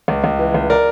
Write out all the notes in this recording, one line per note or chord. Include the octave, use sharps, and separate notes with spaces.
C#2
C#2
E3
C#2
A#4 D5